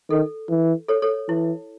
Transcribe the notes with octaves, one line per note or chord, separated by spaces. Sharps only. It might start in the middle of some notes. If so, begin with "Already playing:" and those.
D#3 A4
E3
A4 C#5
A4 C#5
E3 E4